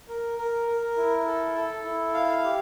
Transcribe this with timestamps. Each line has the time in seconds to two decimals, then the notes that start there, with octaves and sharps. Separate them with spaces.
0.08 A#4
0.38 A#4
0.68 A#4
0.97 E4
1.26 A4
1.55 A4
1.85 E4
2.14 F5
2.44 G4